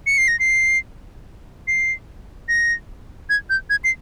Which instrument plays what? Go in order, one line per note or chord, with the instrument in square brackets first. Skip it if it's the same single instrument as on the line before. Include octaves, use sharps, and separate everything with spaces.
[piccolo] C#7
C7
A#6
C7
C7
A#6
G#6
G6
G#6
C7